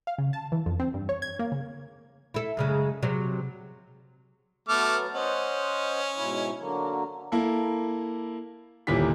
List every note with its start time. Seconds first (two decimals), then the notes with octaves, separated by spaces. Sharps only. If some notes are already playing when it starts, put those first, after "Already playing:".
0.07 F5
0.18 C#3
0.33 A5
0.52 E3
0.66 F2
0.80 C4
0.94 G2
1.09 C#5
1.22 G#6
1.39 A#3
1.52 C#3
2.34 E4 A4
2.57 F#2 C#3 G#3
3.03 C3 F#3
4.68 F#3 A3 B3 D6 F6
5.14 C#4 C5 D#5 F#5
6.16 G#2 B2 E4
6.58 D3 F#3 A#3
7.32 A#3 E4 A4
8.87 G1 D#2 A#2 E4 G4 B6